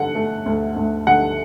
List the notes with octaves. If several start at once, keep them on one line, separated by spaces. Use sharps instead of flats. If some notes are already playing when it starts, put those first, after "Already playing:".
Already playing: D3 F#5
A3
D2
D2
D3 F#5